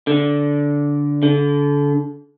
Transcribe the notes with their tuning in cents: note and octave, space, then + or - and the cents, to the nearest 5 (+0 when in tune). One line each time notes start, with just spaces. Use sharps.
D3 -15
D3 -30